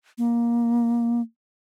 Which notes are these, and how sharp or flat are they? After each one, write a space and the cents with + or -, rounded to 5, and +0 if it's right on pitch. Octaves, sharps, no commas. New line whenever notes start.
A#3 +15